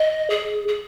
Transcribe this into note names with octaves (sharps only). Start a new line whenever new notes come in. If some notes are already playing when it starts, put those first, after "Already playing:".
Already playing: D#5
G#4
G#4